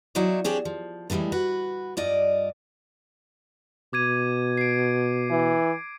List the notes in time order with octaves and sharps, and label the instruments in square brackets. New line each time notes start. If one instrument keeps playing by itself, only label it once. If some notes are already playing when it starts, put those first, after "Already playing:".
[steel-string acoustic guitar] F#3 D#4 E4 C#5 D5
C4 D4 G4 G#4 C#5
F3
A2 D3 E3 G3 G#3
F#4 B4
G2 F4 D5 D#5
[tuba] B2 [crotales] D6 G#6 D#7
[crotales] C7 D7
[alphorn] E3